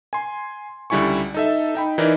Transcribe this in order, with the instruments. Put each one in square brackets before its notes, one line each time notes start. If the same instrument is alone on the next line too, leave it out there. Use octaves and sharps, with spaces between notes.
[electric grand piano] G#5 C6
C#2 D3 G3 E4 G#5 C#6
D#4 A4 E5
D#4 G5 B5
E3 D#4 E4 A#4 D5